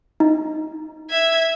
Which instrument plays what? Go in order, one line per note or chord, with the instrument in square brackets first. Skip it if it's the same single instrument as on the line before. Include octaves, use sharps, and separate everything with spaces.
[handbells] D#4
[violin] E5 G#6